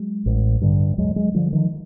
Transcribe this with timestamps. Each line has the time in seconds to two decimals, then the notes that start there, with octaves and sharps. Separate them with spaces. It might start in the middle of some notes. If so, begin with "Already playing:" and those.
Already playing: F#3 G#3
0.26 A1
0.62 G2 D3
0.98 D2 F#3 G#3
1.16 F#3 G#3
1.34 D3 F3 G3
1.53 D#3 F3